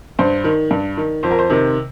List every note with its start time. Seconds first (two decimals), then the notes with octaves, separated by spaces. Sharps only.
0.19 G2 C5
0.44 D#3
0.71 G2
0.97 D#3
1.23 F2 C5
1.31 A#4
1.39 C5
1.50 C3 D#3